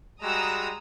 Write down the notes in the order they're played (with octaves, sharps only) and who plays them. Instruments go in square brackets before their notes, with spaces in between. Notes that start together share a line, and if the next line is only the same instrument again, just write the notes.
[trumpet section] G3 G#3 F#4 [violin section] A#5 D#6 E6